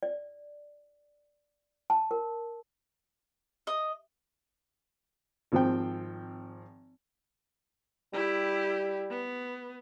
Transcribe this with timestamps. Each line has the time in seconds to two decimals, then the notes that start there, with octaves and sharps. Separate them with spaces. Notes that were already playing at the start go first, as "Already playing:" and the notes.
0.03 D5
1.90 A5
2.11 A#4
3.67 D#5
5.52 G#1 F3 C4 G5
8.13 G3 E4 G4
9.10 B3